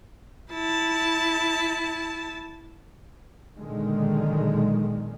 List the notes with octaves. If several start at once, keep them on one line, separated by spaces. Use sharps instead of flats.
E4 A5
B1 A#2 D3 D#3 G#3